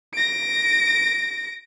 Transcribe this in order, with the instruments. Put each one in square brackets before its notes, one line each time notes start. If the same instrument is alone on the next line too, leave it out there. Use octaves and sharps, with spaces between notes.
[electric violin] A#6 D7